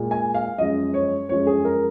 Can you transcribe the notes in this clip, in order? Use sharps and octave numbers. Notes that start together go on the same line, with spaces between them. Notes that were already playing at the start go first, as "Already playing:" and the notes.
Already playing: A#2 G#3
G#5
F5
F#2 F3 G#3 D#5
C#5
F#2 F3 G#3 C#5
G#4
A#4